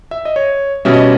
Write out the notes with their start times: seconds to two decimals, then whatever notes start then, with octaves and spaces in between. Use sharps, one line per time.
0.11 E5
0.25 D#5
0.36 C#5
0.85 B2 G3 C#4 E5
0.93 D#5